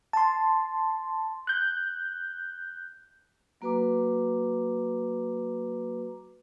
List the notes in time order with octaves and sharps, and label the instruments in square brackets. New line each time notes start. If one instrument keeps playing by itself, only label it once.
[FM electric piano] A5 C6
F#6 G6
[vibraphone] F#3 A#3 F#4 B4 A#5 D6